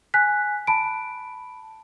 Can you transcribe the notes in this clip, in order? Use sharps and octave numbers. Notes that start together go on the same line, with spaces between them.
G#5 F#6 B6
A5 B5 D7